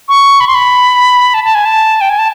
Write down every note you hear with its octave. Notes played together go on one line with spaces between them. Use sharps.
C#6
B5
C6
B5
A5
A5
G#5
A5
G5
G#5
A5